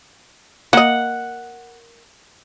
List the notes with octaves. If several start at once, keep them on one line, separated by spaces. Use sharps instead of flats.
A#3 D#5 F#5